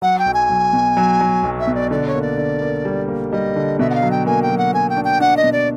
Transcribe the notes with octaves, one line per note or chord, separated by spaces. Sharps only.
F#3 F#5
G5
B1
G#5
B1
B2
F#3
F#3
B1
E5
B2
D5
D3 D5
C#5
A#3
D5
D3
A#3
G3
A#3
G3 D#5
D3
B2 E5
F#5
F5
F#3
G5
A#3 G#5
G5
F#3
F#5
A#3 G#5
G5
D4
G5
D4 F#5
D#5
B2
D5